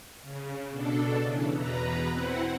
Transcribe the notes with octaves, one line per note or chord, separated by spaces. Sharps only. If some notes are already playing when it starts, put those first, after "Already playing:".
C#3
B2 D4 A4
C#3 E3
E2 B2 B4 A#5
C4 E4 F#5